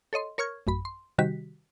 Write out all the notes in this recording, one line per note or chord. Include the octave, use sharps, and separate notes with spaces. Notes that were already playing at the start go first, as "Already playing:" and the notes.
A4 C#5 D#5 C6
A#4 C#5 C#6 F6 G#6
A1 F#2 B5
C6
C3 D#3 G3 F#4 G4 B6